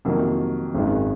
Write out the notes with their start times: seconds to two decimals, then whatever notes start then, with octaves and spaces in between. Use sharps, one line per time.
0.05 F2 C3 D#3 F#3 A#3
0.75 G#1 F#2 D#3 G#3